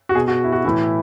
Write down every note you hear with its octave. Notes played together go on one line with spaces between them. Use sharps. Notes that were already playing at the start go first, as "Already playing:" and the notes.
F#4
B2 G#4
F#4
E4
F#4
A2 E3 E4